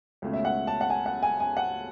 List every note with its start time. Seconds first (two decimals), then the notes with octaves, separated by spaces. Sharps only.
0.22 C#2 B2 A3 C#4
0.33 E5
0.45 F#5
0.67 A5
0.81 F#5
0.90 G#5
1.06 F#5
1.23 G#5
1.40 G#5
1.57 F#5